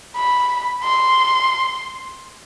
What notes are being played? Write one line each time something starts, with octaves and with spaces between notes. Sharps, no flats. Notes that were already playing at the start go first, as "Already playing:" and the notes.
B5
C6